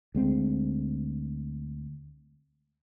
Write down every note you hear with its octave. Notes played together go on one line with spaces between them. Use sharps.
D2 G#3 C4